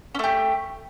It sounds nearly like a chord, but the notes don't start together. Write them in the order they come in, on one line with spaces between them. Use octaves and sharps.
C#4 A3 G4